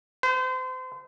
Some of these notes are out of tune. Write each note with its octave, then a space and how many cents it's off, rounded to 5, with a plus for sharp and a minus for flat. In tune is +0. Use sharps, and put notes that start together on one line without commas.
C5 -35